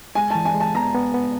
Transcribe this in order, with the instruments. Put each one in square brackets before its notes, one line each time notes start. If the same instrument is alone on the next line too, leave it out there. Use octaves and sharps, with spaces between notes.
[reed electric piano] G#3 [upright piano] G#5
[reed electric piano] E3 [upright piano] A5
[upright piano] G#5
[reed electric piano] G#3
[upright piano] A5
[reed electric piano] B3 [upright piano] A#5
[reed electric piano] B3
B3